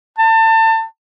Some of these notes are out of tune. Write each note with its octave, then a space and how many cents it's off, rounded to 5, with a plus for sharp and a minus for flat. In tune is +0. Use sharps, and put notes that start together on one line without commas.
A5 +30